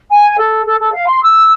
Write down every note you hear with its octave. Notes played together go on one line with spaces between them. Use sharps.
G#5
A4
A4
A4
F5
C6
E6